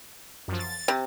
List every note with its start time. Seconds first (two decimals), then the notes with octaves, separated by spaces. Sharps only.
0.48 F#2 F3
0.59 A6
0.88 C3